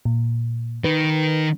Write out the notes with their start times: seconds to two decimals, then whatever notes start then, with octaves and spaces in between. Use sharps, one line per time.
0.05 A#2
0.84 D#3 B4